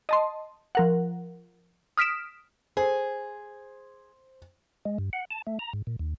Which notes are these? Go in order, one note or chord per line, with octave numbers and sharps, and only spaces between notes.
D#5 A5 C6
F3 A#4 F#5
D#6 F6 B6 D7 E7
G#4 C5
G#3
G2
F#5
A5
A3
A#5
G#2
A#2
D#2